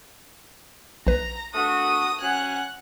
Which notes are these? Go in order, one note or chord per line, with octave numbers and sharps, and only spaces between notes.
A#1 B4 A#5
A3 D4 F#4 D#6
F#3 C#4 F#5 G#5 F#6